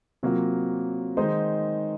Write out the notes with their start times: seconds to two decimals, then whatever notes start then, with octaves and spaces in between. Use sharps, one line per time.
0.23 C3 F#3 A#3 F4
1.17 D#3 G#3 D#4 C5 D#5